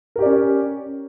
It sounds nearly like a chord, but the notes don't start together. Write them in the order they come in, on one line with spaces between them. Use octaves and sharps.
A#4 G4 D5 C#4